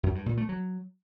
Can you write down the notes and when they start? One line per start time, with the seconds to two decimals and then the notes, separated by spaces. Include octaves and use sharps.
0.03 F#2
0.15 G2
0.26 A#2
0.37 A3
0.49 F#3